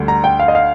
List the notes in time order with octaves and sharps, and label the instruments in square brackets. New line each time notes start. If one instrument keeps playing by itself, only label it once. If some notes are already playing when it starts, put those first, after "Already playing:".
Already playing: [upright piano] D2 D3 G3
[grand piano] A#5
G5
F5
D#5
F5